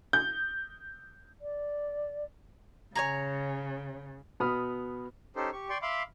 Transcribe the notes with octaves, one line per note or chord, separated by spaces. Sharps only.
G6
D5
C#3 C#5 G#5 A#5
B2 B3 B5 D#6 F6
C#4 D#4 G4 A4 C5
G4 C#6
D5 G5 C6 C#6
E5 F5 B5 C6 D6